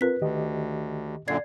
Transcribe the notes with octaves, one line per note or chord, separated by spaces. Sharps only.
C4 F4 A#4 B4 B6
D2 D#3 G4 D#5
F#2 A#2 D3 D5 G#6 C7